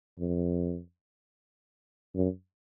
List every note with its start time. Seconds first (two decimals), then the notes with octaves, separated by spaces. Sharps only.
0.19 F2
2.16 F#2